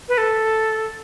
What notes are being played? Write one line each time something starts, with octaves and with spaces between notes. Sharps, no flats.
B4
A4